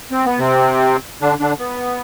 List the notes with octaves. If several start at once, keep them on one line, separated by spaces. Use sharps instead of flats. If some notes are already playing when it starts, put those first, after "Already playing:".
C4
B3
C3 C4
D3 D4
D3 D4
B3